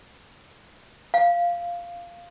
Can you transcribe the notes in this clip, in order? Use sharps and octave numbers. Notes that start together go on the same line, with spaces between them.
F5